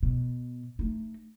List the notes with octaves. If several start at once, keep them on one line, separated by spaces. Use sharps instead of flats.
B2
A3 D#4